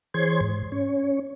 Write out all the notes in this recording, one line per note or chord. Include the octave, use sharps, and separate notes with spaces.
E3 G#4 C5 C#5 C6 G#6
G#2
C#4 C#5